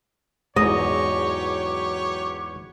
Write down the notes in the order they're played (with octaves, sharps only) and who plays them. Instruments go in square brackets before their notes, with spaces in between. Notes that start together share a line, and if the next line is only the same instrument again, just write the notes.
[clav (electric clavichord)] E2 G#2 [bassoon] F#3 [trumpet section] G4 B4 C#5 [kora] D#5